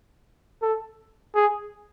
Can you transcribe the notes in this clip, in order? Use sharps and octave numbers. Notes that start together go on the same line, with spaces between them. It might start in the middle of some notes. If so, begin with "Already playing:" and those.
A4
G#4